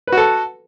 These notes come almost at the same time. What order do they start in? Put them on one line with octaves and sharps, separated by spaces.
B4 F#4 A4